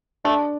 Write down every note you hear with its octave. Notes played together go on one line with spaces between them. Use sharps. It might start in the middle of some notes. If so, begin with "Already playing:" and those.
A3 D4